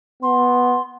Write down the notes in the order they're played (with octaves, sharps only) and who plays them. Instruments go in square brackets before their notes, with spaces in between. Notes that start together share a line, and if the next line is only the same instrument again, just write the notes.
[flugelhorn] B3 [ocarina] C6